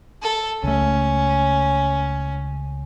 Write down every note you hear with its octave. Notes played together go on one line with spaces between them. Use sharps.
A4
C#2 A3 C#4